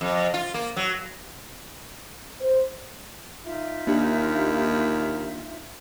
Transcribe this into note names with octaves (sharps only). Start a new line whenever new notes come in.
F2
F4
A#3
F#3
C5
D#4 F4 E5
D#2 A#3 D4 G4